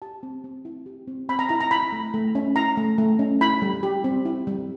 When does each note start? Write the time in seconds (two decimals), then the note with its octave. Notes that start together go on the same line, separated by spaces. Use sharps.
0.02 G4 A5
0.23 C4
0.44 C4
0.65 E4
0.86 G4
1.08 C4
1.29 C4 B5
1.39 A#5
1.49 E4 A#5
1.60 A#5
1.71 E4 B5
1.92 A3
2.14 A3
2.35 C#4
2.56 E4 A#5
2.77 A3
2.98 A3
3.19 C#4
3.41 E4 B5
3.62 G3
3.83 G4
4.04 C4
4.25 E4
4.47 G3